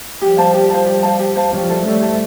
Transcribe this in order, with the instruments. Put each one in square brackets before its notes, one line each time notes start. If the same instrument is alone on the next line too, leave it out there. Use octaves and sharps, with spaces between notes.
[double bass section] F3 G3 [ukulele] G4
[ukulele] C5 F5 A5
G4
C5 F5 A5
G4
C5 F5 A5
G4
C5 F5 A5
[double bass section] F3 G3 [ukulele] C#4
[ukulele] E4 A4 C5
[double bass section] G3 A3 [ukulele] C#4
[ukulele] E4 A4 C5